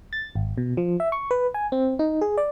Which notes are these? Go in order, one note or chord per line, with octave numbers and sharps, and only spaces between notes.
A6
G#1
B2
F3
E5
C#6
B4
G#5
C4
D#4
G#4
D5